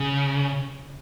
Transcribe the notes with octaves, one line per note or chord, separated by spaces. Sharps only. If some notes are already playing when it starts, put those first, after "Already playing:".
Already playing: C#3